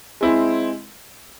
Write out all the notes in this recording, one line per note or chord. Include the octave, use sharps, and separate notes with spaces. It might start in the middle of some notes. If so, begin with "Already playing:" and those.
G#3 C4 E4 G#4